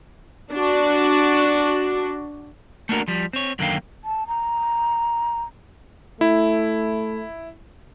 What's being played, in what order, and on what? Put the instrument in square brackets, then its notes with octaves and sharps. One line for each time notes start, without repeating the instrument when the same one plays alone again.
[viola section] D4 F#4
[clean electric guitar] A3 A#3 D4 F#4 A#4
F3 G3
C4 C#5
F#2 D3 D#3 A#3 F5 G5
[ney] A5
A#5
[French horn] A3 [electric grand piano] E4